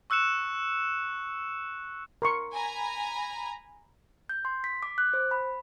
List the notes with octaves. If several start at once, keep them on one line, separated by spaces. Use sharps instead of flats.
C#6 E6 F#6 C#7 E7
A#4 C6 C#6
G#5 A#5 B5
G6
C6
B6
D6
F#6
C5
B5